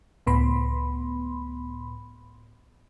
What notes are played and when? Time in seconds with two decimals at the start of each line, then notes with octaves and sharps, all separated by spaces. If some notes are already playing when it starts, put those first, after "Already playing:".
0.26 C#2 A2 B3 B5 C6